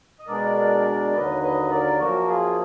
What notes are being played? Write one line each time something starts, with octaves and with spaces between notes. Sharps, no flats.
D#5
B2 G#3 B3 D4 A#4 D5
D#2 D3 F#3 B4 D#5
B4 D#5
A#4 D5
F#2 F3 A#3 F#4 A#4
F4 G#4